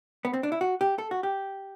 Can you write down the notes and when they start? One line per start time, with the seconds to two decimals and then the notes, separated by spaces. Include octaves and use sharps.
0.25 B3
0.33 C4
0.43 D4
0.52 E4
0.61 F#4
0.81 G4
0.98 A4
1.11 F#4
1.23 G4